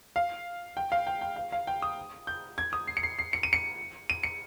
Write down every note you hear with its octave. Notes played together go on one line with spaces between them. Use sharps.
F5
G5
F5
G5
G5
F5
F5
G5
D#6
G6
G#6
D#6
C7
C#7
C7
C7
C#7
D#7
C#7
D#7
C#7